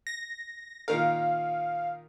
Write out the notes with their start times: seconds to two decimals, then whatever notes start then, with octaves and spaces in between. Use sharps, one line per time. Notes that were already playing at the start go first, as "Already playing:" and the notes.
0.07 A#6
0.88 A#2 D#3 A#4 F5